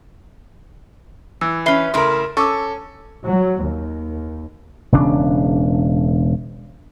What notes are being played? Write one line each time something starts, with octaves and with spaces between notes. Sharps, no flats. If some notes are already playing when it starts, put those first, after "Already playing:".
E3 E6
C#4 B4 E5 C7 G7
C#3 A3 E4 A#4 C6
C#4 A4 C#6 D6 E6
F#3
D#2
E1 C#3 D4